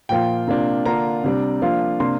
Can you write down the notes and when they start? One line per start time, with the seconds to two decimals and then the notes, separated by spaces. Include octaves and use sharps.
0.09 A#2 F3 A#3 F4 G5
0.48 C3 A#3 D4 F4
0.86 D3 A#3 D4 F4 A#5
1.24 C3 G3 D4
1.62 F3 A#3 D4 F4
2.00 C3 A#3 D4 C6